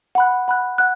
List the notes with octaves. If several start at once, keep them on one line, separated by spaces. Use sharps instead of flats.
F#5 B5 F#6
F#5 B5 F#6
F#5 F#6